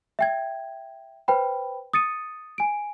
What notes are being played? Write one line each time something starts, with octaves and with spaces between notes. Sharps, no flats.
E5 G5 G#6
B4 C5 G5 B5
D#6 A6 C#7 D#7
G#5 D7